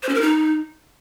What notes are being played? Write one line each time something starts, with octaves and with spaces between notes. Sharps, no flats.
C5
C#4
A#4
D#4